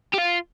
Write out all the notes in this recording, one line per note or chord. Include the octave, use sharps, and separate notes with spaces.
G4
F4